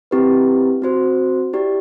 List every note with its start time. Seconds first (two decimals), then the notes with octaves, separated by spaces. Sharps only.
0.11 C4 E4 G4 B4
0.82 C4 F#4 C5
1.53 E4 G4 D5